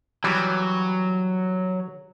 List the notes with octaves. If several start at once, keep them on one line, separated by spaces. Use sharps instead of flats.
E3 F#3 G3 B3